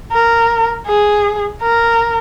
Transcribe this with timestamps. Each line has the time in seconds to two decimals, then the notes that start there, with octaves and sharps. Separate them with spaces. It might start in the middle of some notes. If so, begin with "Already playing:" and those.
0.12 A#4
0.87 G#4
1.61 A#4